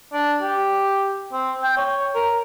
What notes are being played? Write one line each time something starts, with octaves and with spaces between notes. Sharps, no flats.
D4
G4
C4
G5
C#5
A#4